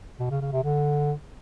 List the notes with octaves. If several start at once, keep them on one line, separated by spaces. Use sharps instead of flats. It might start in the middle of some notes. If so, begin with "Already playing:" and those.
B2
C#3
C#3
C3
D3